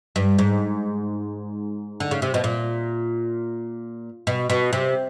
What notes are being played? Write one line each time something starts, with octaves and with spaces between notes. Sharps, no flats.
G2
G#2
D3
C#3
C3
B2
A#2
B2
B2
C3